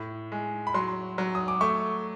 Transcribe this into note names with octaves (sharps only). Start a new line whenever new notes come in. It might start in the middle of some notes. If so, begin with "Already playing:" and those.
Already playing: A2
G#3
B5
F#3 C6
F#3
D#6
D6
A3 C#6